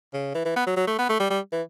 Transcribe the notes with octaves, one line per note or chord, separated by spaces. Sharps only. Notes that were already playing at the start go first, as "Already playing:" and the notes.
C#3
E3
E3
B3
F#3
F#3
A3
B3
A3
G3
G3
E3